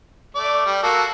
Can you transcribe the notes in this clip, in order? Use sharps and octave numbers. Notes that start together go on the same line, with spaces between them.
A3 D5
G3
A#3 F#4 A4